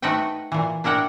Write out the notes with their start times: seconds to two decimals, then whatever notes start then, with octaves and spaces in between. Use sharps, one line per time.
0.02 A3 D#4 F#4 B4 F#5 G5
0.52 A#2 E3
0.84 D4 E4 A#4 F#5 G5